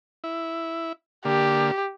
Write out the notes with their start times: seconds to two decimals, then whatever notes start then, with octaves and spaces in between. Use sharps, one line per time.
0.24 E4
1.25 D3 A#3 G4